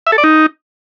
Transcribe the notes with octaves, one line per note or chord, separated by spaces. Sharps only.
E5
A4
D5
D#4